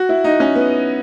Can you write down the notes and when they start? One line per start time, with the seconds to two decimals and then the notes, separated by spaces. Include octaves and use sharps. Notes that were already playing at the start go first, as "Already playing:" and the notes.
Already playing: F#4
0.09 E4
0.24 D#4
0.40 C#4
0.55 B3